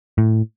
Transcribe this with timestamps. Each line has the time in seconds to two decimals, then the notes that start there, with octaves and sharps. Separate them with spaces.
0.18 A2